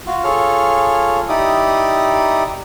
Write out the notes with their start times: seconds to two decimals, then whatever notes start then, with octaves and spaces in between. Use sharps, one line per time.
0.06 F4 F#4
0.24 F4 G#4 A4 C#5 F6
1.29 D#4 E4 G4 D5 D#6